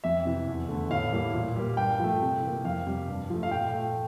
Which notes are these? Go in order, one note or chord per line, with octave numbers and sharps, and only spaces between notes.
F2 E5
C3 E3
E2
D3 A3
A2 F5
E3 G3 A#3
A#2
G3 A#3
G2 G5
F3 A3
C3
E3 A#3
F2 F5
C3 G3
G2
F3 A3
F5
A#2 G5
A3